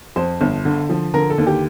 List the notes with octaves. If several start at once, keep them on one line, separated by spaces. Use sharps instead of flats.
F2 C5
G1
D3
F3
D3 A#4
A4
D#2
G4